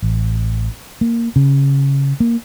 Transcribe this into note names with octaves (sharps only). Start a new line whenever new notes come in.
A1
A#3
C#3
A#3